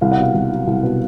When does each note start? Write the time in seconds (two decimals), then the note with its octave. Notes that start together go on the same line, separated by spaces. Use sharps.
0.01 C2 F5
0.12 F#5
0.18 B2 F5
0.34 C2
0.51 F#3
0.67 C2
0.83 B2